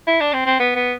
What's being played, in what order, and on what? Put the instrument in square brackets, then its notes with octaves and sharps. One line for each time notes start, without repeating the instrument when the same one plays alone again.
[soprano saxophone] E4
D4
C4
C4
B3
B3